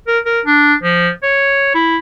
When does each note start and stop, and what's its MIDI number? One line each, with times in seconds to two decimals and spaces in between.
0.07 0.19 70
0.25 0.40 70
0.45 0.75 62
0.83 1.10 53
1.23 1.73 73
1.74 1.98 64